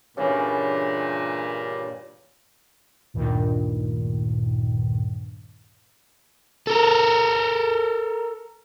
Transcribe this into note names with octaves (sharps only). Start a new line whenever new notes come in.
G2 A#2 C#3 E3
D2 G2 A#2 D#3
A4 A#4